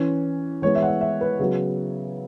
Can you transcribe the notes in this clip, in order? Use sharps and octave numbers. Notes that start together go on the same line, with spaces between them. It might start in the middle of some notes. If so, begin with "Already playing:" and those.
Already playing: E3 C#4
E3 G#3 B3 C#5
E5
F#5
E5
E5
B4
C#3 F#3 B3